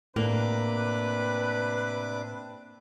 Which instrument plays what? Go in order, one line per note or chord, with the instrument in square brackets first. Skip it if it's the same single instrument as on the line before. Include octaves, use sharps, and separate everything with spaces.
[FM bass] A2 [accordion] C3 D4 D6 [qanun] A#3 [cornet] B4